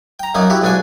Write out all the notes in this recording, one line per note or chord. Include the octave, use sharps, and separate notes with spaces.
G5 A#5
F#2 F#3 A#3 D#4
E4 F#4 G4
B1 G#2 D4 F#4 G#5